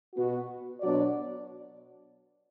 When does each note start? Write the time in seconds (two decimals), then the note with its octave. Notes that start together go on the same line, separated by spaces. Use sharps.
0.15 B2 B3 F#4
0.80 B2 F#3 D4 F#4 D5